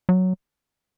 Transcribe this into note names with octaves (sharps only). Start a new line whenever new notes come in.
F#3